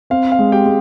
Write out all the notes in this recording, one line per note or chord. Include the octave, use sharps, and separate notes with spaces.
C4 F5
F5
G#3
G4 G5
G#3